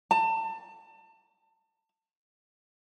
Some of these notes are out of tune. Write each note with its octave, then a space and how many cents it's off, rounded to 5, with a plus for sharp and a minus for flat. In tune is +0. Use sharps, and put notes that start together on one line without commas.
A5 +30